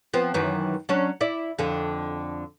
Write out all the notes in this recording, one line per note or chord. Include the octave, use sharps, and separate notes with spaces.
F3 B3 C4
F#2 D#3 E3
F#3 C#4 D4
E4 D5
F2 D3